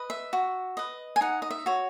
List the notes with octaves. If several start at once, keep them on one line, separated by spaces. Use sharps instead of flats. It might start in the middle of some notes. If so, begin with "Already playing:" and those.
Already playing: B4 D#5
E5
F#4
B4 D#5
G#5
D#4 F#5
D#5
E5
F#4 C#5